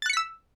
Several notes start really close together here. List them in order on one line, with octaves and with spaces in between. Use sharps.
A6 F#6 C#7 B6 E6